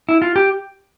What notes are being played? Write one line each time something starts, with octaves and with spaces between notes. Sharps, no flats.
E4
F4
G4